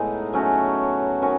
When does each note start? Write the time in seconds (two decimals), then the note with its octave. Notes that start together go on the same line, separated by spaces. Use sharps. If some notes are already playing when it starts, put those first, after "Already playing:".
Already playing: A2 G#3 B3 D#4
0.33 F#3 A3 C#4 F#4
1.22 D#3 F#3 C#4 F#4